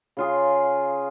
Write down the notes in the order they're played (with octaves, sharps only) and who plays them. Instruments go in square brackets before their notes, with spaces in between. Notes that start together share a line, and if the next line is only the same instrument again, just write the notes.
[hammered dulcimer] C#3 F4 G#4